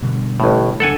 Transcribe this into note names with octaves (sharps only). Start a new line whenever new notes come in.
B2 D3 G3
A1 A2
F1 C#2 D4 A4 F#5 G#5